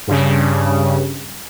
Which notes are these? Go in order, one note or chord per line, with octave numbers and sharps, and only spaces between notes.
G2 C#3